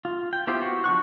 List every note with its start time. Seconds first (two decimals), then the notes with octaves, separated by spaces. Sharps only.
0.05 F4
0.33 G5
0.47 B3 E4 F4 G4 C5
0.62 F#4
0.84 F3 D4 C#6 F#6